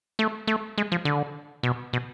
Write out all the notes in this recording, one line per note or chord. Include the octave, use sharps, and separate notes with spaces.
A3
A3
G#3
F3
D3
B2
B2